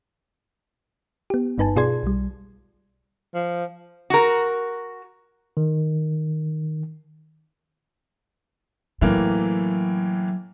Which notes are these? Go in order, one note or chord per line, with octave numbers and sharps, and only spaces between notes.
B3 G4
G1 G2 D#4 B4 G#5 A5
B2 F4 G#4 D5 C6 G#6
B1 G3
F3
F#4 A#4
D#3
A2 E3 F#3 A#3